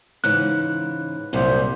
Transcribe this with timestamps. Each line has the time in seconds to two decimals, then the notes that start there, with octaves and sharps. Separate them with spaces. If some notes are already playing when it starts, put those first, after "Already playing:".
0.24 G#2 C#3 E3 F#6
1.33 C2 F#2 A#2 G3 C5